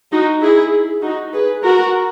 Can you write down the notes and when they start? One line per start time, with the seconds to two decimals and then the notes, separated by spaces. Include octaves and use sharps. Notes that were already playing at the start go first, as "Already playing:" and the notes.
0.12 D#4 F#4
0.42 E4 G#4
1.02 D#4 F#4
1.33 G#4 B4
1.64 F#4 A#4